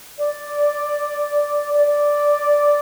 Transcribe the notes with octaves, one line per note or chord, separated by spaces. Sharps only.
D5
D5